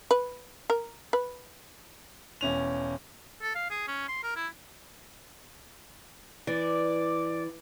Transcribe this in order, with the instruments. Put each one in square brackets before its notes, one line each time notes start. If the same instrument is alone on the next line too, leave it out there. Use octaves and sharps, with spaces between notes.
[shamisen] B4
A#4
B4
[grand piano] E1 C#4 F7
[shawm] A4
F5
G#4
C#4
C6
A#4
E4
[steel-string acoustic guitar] E3 [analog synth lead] D5